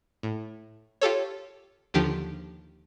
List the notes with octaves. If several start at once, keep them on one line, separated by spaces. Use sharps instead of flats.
A2
F4 G4 A4 C#5
D#2 D3 F3 D4 G4